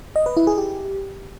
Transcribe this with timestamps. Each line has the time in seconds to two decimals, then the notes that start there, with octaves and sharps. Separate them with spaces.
0.16 D#5
0.26 B4
0.37 E4
0.47 G#4
0.58 G4